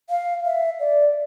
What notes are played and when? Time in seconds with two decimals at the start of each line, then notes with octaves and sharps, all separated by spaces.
0.10 F5
0.45 E5
0.80 D5